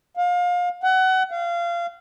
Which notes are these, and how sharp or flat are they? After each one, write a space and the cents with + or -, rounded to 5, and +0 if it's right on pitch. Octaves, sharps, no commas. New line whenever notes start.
F5 +30
F#5 +25
F5 -25